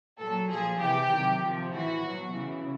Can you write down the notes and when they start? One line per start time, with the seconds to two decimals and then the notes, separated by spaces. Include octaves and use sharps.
0.19 A#2 F#3 A4
0.50 A#2 F3 G#4
0.80 C3 E3 G4
1.10 C3 D#3 F#3
1.41 C3 F3
1.71 A2 E3 F#4
2.03 B2 F#3
2.34 C#3 E3